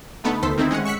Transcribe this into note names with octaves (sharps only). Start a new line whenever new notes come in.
D3 A3 B3 D#4 A4 B4
D2 D#3 A4 C5 C6 B6
D#3 A3 C4 D#4 E4
G#3 C#4 C#5 F#5
C#6 E6 F#6 B6 C#7